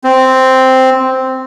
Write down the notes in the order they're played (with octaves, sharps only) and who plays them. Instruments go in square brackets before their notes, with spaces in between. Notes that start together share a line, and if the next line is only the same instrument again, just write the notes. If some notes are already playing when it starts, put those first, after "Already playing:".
[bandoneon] C4